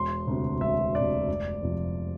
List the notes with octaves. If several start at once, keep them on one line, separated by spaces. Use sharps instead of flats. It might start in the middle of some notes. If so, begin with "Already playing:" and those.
Already playing: E1 C6
D2 C3
E1 E5
D2 C3 D5
F1
F2 C3 F3